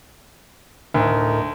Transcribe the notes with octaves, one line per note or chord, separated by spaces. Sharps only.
D2 A2 D#4 A#4